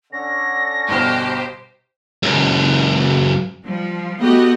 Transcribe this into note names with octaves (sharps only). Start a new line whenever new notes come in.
D3 C#4 A#6
G1 B2 G4 C5 F6
C#2 F#2
F3 G3
A3 B3 F#4 G4 B4 D#5